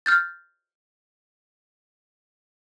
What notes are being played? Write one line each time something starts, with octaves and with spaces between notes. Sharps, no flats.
F6 G6 A6